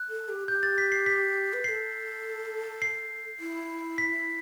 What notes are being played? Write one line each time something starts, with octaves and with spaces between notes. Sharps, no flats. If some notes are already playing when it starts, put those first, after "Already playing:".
Already playing: F#6
A4
G4
G4 G6
A6
B6
C7
B6
B4
A4 B4 C7
C7
E4
B6